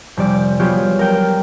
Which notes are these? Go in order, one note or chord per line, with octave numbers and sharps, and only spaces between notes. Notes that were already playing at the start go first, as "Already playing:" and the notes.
F1 G3 D5
F#3 B3 F4 G4 G#4
A#4 G5 A#5